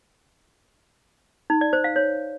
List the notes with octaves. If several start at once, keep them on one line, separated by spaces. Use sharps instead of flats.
D#4
D5
C5
F5
C#5